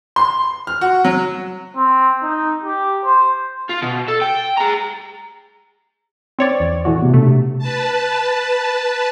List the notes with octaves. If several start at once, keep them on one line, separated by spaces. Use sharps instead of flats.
C6
F6
F#4
F#3
C4
D#4
G4
C5
F4
B2
A4
G5
G#4 A#5
C4 C#5 D5
E2
A2 E3 F#4
C3 B3
B2 A3 C4 D4
B4 A5